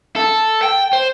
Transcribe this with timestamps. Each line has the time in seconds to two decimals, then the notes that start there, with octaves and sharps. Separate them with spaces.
0.16 A4
0.63 G5
0.93 C5